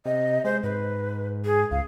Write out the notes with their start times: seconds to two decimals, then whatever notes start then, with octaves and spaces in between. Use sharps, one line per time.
0.05 C3 D#5
0.44 G#3 C5
0.63 G#2 B4
1.45 G#4
1.71 C#2 F5